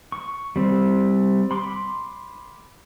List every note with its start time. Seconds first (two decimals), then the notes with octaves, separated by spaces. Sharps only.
0.12 C#6
0.56 G3 C4
1.51 B5 C6 D6